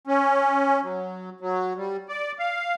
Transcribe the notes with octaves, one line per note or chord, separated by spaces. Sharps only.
C#4
F#3
F#3
G3
D5
F5